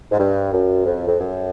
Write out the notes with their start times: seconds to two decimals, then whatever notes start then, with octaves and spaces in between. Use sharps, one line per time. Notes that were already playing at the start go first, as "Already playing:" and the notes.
0.12 G#2
0.19 G2
0.53 F#2
0.85 F2
1.07 F2
1.19 F#2